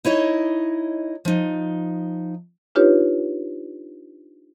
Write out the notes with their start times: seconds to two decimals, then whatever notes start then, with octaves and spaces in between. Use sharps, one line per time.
0.05 D#4 E4 C#5 D#5
1.25 F3 D#4
2.75 D4 D#4 F4 G4 B4 C#5